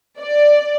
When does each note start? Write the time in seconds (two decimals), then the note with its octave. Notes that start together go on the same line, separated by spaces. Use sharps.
0.20 D5